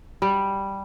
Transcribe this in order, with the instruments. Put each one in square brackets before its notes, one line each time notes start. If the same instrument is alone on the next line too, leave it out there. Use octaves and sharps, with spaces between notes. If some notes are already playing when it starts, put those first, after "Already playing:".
[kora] G3